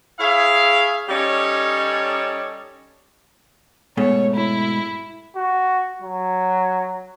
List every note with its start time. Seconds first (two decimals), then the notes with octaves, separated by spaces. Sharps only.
0.19 E4 G#4 C#5 E5 F5
1.09 G3 C#4 D#4 A4 C#5 D5
3.97 G#2 B2 A3 C#5
4.34 E4
5.36 F#4
6.02 F#3